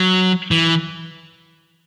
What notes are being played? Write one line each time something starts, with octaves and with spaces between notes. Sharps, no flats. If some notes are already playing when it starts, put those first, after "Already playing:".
Already playing: F#3
E3